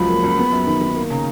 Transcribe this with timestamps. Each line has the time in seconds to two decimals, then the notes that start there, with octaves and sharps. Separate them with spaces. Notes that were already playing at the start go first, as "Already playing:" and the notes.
Already playing: C#2 F3 F#3 B5
0.09 A#3
0.24 C#2
0.38 B3
0.52 F#2
0.67 D#3
0.81 D#3
0.96 A#3
1.10 C#3 A#5